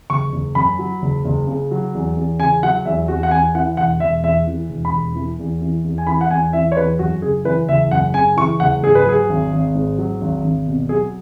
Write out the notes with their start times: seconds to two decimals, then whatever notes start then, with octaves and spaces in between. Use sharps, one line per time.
0.10 F#1 C#6
0.32 F#1
0.55 F#2 B5
0.79 F#3
1.02 F#1
1.24 F#1
1.47 C#3
1.71 F#3
1.94 E2
2.17 E2
2.39 C#3 G#5
2.63 F#3 F#5
2.85 E2 E5
3.08 E2 F#4
3.23 F#5
3.31 E2 G#5
3.55 E3 F#5
3.77 E1 F#5
4.00 E1 E5
4.23 E2 E5
4.47 E3
4.70 E1
4.85 B5
4.92 E1
5.15 E3
5.39 E2
5.61 E3
5.84 E2
5.98 G#5
6.07 E3 B5
6.21 F#5
6.30 E2 G#5
6.53 E3 E5
6.72 C#5
6.77 E2 B4
6.99 F#2 F#4
7.22 C#3 G#4
7.45 E3 B4
7.68 F#1 E5
7.91 F#2 F#5
8.14 C#3 G#5
8.37 E3 C#6
8.60 F#1 F#5
8.82 G#2 G#4
8.95 B4
9.06 F#3 G#4
9.29 G#1
9.53 G#1
9.75 G#2
9.98 F#3
10.21 G#1
10.44 G#1
10.67 B2
10.89 F#3 G#4